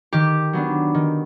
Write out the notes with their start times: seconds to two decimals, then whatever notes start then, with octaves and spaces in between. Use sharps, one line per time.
0.13 D#3 G4
0.53 F#3 B3 D4
0.94 D#3